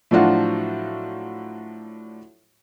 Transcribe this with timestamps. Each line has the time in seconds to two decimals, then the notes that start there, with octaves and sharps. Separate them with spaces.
0.11 A2 F3 F#3 D4 F4 F#4